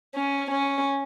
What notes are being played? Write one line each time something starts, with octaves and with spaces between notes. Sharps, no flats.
C#4
C#4